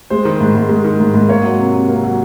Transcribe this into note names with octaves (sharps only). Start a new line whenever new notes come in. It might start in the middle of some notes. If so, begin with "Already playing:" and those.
G#3 C5
D#3
G#2
G#2
G#3
D#3
G#2
G#2
A#3 C#5
F#3
C3
C3
A#3
F#3